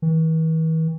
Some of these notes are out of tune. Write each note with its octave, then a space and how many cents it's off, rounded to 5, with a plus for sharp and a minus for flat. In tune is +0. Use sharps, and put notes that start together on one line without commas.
E3 -45